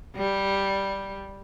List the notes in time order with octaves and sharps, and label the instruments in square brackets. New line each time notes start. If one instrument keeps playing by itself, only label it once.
[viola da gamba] G3